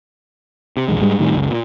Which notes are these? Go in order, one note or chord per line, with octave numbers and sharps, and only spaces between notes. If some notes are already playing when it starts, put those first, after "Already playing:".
C3
E1 A#1 D#2 G#3
G#2 G3 G#3
A2 D#3 G3
F#1 C#2
A#2